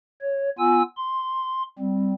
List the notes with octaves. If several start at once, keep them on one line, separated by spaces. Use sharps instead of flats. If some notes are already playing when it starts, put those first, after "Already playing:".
C#5
B3 F4 G#5 E6
C6
G3 C4